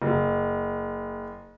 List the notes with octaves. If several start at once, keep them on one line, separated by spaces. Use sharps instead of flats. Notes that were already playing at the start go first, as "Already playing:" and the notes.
F#1